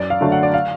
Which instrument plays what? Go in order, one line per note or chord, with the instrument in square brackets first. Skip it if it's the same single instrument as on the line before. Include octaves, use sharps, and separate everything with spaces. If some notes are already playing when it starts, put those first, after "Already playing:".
Already playing: [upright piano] F#2 D5
F5
D3 F#3 A3
F#5
D5
F5